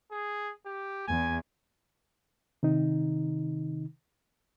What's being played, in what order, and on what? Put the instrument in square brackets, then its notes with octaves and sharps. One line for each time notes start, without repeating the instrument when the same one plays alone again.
[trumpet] G#4
G4
[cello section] E2 [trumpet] G#5
[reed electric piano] C3 D#3 D#4